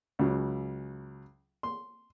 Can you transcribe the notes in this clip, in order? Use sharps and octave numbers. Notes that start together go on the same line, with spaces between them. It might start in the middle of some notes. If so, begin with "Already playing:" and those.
C#2 C#3 F#3
C6